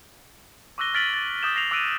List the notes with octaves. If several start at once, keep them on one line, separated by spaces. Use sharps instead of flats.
C#6 D6 E6 F#6 A#6 G7
F6 A6 B6 D7 F#7 G7
A6
D6 D#6 G6 A6 E7
A#6 C7 F7
D6 E6 F#6 D7 D#7